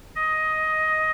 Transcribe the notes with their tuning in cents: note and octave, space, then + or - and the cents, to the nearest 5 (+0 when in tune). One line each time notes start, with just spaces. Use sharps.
D#5 +10